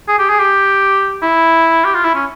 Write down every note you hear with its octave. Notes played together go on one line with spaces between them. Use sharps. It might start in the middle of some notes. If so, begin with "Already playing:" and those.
G#4
G4
G#4
G4
E4
G4
F4
E4
C#4